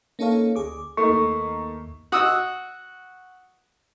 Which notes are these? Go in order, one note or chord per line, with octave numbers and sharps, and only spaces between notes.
A#3 C#4 D#4 A4 C#5 F5
D2 G#4 D6
A3 A#3 D#4 C#6
D#2
F#4 D#6 E6